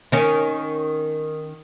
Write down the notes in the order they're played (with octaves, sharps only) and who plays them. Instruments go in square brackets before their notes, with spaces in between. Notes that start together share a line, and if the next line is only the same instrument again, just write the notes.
[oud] D#3 C#4